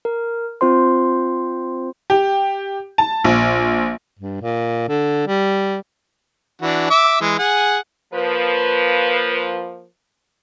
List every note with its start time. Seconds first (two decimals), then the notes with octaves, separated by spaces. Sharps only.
0.05 A#4
0.61 C4 F4 C5 C6
2.10 G4
2.98 A5
3.24 A#1
4.19 G2
4.42 A#2
4.88 D3
5.27 G3
6.62 E3 D4 F#4
6.90 E5 D6 E6
7.21 E3 G#3
7.39 G#4 F#5 G#5
8.13 F3 A#3 B4